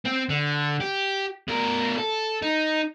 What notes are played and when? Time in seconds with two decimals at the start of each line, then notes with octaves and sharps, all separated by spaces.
0.06 C4
0.29 D3
0.80 G4
1.48 B2 A#4
1.98 A4
2.42 D#4